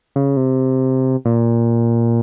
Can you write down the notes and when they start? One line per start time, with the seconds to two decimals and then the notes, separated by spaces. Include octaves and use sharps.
0.16 C#3
0.37 C3
1.25 A#2